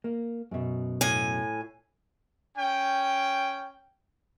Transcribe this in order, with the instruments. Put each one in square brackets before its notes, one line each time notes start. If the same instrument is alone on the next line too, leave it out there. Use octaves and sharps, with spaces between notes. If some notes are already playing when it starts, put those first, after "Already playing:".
[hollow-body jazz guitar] A#3
F#2 B2
[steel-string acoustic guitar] A2 G#5
[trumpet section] C#4 G5